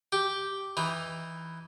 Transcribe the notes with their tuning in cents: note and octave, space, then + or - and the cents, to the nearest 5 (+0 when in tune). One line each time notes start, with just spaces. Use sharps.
G4 -5 G5 +0
E3 +0 D#4 +0 G5 +40